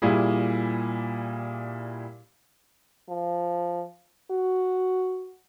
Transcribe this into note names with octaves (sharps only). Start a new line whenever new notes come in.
A#2 G3 E4 G#4
F3
F#4